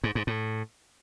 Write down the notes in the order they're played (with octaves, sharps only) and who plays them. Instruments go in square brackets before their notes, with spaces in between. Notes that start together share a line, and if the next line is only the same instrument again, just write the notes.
[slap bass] G#2
G#2
A2